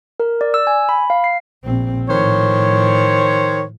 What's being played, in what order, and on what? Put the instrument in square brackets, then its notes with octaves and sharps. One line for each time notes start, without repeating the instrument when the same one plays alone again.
[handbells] A#4
D5
E6
G#5
B5
F5
C7
[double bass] A#1 C4
[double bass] A2 F3 [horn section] D#3 C5 C#5